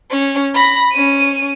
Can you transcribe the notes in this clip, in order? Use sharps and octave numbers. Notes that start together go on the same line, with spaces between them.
C#4
B5 A#6
C#4 D#7